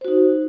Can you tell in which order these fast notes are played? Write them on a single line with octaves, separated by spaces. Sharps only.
C5 F#4 D#4